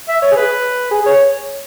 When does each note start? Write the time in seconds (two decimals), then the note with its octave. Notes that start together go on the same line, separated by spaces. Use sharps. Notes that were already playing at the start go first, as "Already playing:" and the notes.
0.08 E5
0.22 C#5
0.31 G#4
0.36 B4
0.91 G#4
1.06 C#5